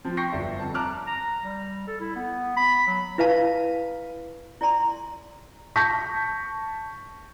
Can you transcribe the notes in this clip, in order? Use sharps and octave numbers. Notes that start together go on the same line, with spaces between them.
F3 C4
G5 C#6 G6 A#6 C7 C#7
G1 D5 E5
F2 A5
A5 A#5 D6 F6 F#6
A#5
G3
A4
E4
B3
B5
F#3
E4 B4 F5 A5
E4 D5 G#5 A#5 C6
A5 C#6 G6 A#6 B6